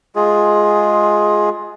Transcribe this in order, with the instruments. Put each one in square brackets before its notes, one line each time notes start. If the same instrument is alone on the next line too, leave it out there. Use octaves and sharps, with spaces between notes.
[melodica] G#3 F4 G#4